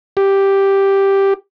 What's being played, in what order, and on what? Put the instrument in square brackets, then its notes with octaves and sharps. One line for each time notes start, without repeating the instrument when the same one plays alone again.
[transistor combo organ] G4